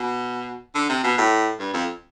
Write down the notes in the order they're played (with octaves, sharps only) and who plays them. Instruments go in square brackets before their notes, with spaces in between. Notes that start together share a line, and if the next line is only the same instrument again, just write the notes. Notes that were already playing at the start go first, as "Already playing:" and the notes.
Already playing: [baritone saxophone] B2
D3
C3
B2
A2
G2
F2